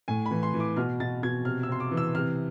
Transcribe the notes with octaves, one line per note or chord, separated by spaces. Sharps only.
A2 G#5
B5
E3
C6
E3
D6
B2 F6
B2 A6
B2 G#6
C3 F6
E6
C3 C6
D6
E3
E6
C3 F6